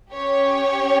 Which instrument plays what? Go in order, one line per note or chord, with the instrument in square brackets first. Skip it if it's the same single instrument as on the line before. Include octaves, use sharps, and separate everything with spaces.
[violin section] C#4 G4 C#5